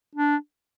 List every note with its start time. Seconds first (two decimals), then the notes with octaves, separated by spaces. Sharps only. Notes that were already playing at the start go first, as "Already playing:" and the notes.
0.15 D4